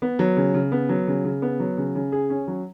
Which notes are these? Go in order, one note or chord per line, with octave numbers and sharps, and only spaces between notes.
B3
F#3
C#3
C#3
B3
F#3
C#3
C#3
B3
F#3
C#3
C#3
G#4
C#4
F#3